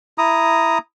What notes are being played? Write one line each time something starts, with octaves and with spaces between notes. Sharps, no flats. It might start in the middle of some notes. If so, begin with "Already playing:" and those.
E4 A#5 D#6